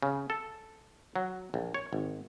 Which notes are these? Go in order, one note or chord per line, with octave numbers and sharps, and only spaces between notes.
C#3
A4
F#3
A#1
C#5
G#1